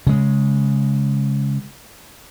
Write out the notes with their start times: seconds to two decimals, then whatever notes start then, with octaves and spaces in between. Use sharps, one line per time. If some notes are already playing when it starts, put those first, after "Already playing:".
0.07 C#3 G#3